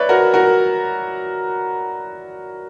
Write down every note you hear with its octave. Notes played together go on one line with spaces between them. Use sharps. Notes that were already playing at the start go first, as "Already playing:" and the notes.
Already playing: B4 C#5 D5 E5
F#4 A#4
F#4 A#4